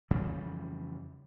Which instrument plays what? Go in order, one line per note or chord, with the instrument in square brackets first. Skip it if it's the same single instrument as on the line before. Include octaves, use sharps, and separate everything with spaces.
[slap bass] F2 C#3 E3 G3